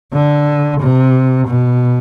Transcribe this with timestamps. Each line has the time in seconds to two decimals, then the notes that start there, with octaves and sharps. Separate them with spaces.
0.13 D3
0.80 C3
1.48 B2